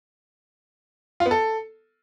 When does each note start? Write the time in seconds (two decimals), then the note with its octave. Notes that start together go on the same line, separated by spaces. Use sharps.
1.20 F4
1.26 B3
1.31 A4